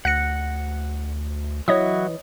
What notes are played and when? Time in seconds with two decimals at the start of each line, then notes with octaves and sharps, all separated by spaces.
0.05 D2 F#5 F#6 A#6 C#7
1.68 E3 F#3 E4 F#4 C#5 D#5 D#6